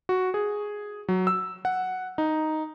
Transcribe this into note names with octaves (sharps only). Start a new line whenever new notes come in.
F#4
G#4
F#3
E6
F#5
D#4